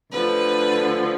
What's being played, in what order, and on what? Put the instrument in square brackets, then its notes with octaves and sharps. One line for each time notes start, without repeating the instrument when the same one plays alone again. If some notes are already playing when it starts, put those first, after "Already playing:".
[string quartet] D2 D3 F3 B4